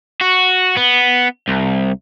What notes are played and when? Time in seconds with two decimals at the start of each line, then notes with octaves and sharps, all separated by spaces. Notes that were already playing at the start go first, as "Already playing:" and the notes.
0.21 F#4
0.77 B3
1.48 C2